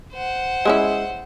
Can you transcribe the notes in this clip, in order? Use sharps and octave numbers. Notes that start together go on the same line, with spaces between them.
C5 F#5
G#3 C#4 E4